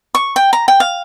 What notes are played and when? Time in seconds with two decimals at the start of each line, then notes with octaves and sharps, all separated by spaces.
0.15 C#6
0.36 G5
0.53 A#5
0.68 G5
0.80 F5